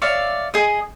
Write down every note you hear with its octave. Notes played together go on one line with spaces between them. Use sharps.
C#5 D5 E5 F5
G#4 D#5